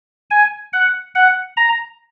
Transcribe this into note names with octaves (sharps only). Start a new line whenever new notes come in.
G#5
F#5
F#5
A#5